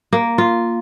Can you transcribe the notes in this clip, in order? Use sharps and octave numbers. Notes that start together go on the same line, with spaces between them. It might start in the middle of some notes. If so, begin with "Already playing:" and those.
A#3
F4